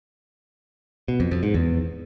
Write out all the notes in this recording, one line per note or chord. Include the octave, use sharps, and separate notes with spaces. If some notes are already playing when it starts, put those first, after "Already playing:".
B2
F2
F2
G#2
E2